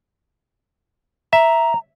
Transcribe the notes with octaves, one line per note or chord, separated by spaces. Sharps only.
E5 A#5